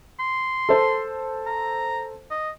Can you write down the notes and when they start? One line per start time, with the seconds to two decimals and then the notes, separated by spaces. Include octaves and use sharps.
0.20 C6
0.69 A4 C5
1.47 A#5
2.31 D#5